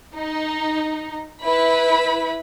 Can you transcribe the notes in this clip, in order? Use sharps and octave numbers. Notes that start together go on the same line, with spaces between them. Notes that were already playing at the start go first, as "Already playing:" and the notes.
D#4
E4 B4 B5